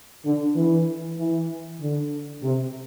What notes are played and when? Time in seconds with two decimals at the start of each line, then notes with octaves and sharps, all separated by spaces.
0.25 D3
0.55 E3
1.18 E3
1.80 D3
2.42 C3